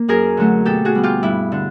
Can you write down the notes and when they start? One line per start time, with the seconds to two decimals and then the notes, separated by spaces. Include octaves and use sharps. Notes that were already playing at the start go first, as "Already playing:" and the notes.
Already playing: A#3
0.08 F#2 G#4 A#4
0.37 D3 F#3 A3
0.66 B2 G4 A4
0.85 F#4 G#4
0.95 G3 B3
1.03 F4 G4
1.23 G2 E4
1.52 D3